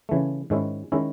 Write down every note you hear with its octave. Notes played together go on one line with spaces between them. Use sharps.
C#3 E3 A3
G#2 D#3 G#3 C#4 E4
D#3 G#3 C#4 E4